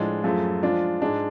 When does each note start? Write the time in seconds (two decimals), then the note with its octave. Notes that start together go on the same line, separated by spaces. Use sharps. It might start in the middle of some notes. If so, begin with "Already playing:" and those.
Already playing: A2 F3 G#3 D4
0.24 F#2 F3 A3 F4 G#4
0.63 F3 G#3 D4 F4
1.02 G#2 G#3 D4 G#4